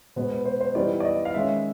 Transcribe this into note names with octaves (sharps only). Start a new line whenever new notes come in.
B2 G#3 B3 C5
B4
C5
C5
E3 G3 B3 D#4 D5
D5
D#5
F5
D#3 G#3 C#4 E5